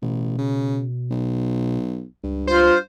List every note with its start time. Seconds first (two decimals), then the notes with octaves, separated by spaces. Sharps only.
0.02 A1 B2
0.38 C#3
1.10 B1
2.24 C#2 G2
2.47 F4 C5